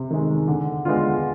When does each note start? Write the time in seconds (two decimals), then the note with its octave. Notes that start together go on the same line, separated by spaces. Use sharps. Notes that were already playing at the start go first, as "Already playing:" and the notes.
Already playing: C3
0.11 D#3 G#3
0.48 D3
0.85 G#3 B3 D4 F4